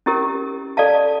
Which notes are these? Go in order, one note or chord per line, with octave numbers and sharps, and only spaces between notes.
C#4 E4 G4 A#4
A4 D5 F5 A5